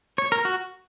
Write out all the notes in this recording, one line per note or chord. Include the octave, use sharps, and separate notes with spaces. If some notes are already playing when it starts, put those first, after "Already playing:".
C#5
A#4
F#4